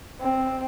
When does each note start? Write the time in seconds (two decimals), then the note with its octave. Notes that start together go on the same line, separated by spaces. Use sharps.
0.21 C4